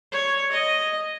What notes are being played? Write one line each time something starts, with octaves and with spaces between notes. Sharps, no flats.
C#5
D#5